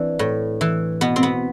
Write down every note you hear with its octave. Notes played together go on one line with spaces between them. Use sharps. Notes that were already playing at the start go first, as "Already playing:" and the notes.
Already playing: E3 C4 D4
A2
E3
B2 B3
C4
B3